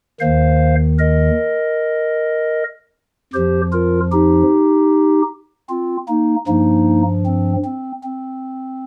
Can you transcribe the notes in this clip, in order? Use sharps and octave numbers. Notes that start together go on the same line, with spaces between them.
D#2 D#3 C5 F5
A#4 D#5
F2 F3 G4 C5
F4 A#4
D#4 G4
C4 F4
A#3 D#4
G2 F3 A#3 D#4
C4
C4
C4